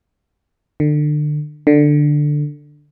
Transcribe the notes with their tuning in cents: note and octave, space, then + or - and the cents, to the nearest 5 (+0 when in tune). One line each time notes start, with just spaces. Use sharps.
D3 +30
D3 +10